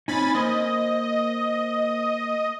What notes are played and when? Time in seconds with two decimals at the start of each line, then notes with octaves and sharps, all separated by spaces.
0.08 C4 C#4 D#4 G#5 B5 A6
0.35 A#3 C5 D#5